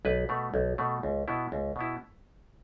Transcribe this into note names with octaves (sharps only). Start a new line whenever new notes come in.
B1 B4
B2 A3
B1
B2 A3
C#2
B2 B3 E4
C#2
B2 B3 E4